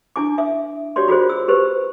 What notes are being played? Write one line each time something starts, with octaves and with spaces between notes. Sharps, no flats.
D4 E4 G#5 D6
E5
F#4 G4 C#5 D5 C6
F4 F#4 G#4 C5
E6
G4 B4 C5